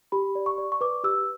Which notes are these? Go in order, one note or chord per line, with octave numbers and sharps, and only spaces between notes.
G4 B5
D5
C#6
D5
C#6
B4 D6
G4 E6